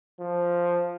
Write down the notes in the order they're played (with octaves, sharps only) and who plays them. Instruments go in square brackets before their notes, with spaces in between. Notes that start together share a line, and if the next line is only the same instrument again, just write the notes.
[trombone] F3